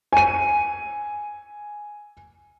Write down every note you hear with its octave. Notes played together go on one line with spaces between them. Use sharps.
G#5 D#7